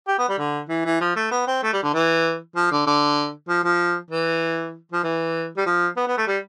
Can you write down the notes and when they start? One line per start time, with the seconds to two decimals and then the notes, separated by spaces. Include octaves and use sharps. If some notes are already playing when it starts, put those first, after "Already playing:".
0.08 G4
0.18 B3
0.29 G3
0.38 D3
0.69 E3
0.85 E3
1.01 F3
1.16 A3
1.31 B3
1.47 C4
1.63 A3
1.73 G3
1.83 D3
1.94 E3
2.56 F3
2.71 D3
2.87 D3
3.48 F3
3.64 F3
4.11 E3
4.92 F3
5.03 E3
5.57 G3
5.66 F3
5.97 B3
6.07 B3
6.17 A3
6.27 G3